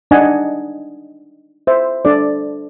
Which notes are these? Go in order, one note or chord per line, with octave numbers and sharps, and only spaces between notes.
D4 D#4 D#5 F#5 G#5
C5 E5
D4 A4 D5